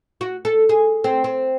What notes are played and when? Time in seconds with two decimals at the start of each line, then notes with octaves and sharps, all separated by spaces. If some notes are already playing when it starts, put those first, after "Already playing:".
0.21 F#4
0.45 A4
0.69 G#4
1.04 C4
1.24 C4